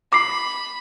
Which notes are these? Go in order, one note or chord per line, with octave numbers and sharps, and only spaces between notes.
B5 D6 C7